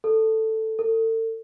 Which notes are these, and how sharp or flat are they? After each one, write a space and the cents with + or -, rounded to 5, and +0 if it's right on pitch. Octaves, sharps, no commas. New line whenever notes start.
A4 +5
A4 +35